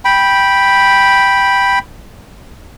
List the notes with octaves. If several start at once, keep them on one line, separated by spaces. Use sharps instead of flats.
G5 B5